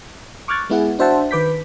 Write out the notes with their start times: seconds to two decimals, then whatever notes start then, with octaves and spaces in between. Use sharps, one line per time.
0.48 C#6 D6 F6 F#6 G#6 A6
0.70 G#3 B3 E4 G#4 F#5
0.99 D4 F#4 C5 E5 F#5 A5
1.31 D#3 B4 D6 G6 B6